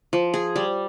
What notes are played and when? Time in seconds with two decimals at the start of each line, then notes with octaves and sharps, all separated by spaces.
0.13 F3
0.34 G#4
0.56 G3